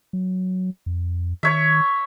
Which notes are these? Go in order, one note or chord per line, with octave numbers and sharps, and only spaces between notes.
F#3
F2
D#3 C#5 E5